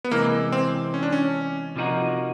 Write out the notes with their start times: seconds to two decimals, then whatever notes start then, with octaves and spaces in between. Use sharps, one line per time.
0.05 B3
0.11 C3 E3 G#3 A#3
0.52 C4
0.94 C#4
1.03 D4
1.12 C#4
1.76 C3 F3 A#3 D#4 F#4